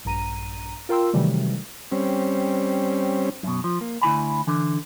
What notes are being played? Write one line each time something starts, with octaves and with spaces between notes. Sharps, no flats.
A#1 G2 A#5 D#7
F4 A#4 G5 C6 E6
C3 D#3 E3 F#3 G3 A3
G3 C4 C#4
F#2 B2
F3
A#3
D2 E4 G#5 B5
D3 E3